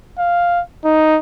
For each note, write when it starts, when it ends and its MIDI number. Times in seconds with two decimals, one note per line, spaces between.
0.19 0.61 77
0.85 1.19 63